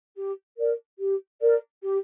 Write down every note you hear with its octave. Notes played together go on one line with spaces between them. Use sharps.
G4
A#4 D5
G4
A#4 D5
G4